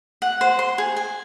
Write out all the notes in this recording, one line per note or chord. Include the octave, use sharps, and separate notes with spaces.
F#5
C5
C6
G#4
G#5